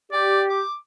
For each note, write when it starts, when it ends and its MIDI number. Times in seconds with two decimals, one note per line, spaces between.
0.12 0.63 67
0.12 0.43 74
0.50 0.75 86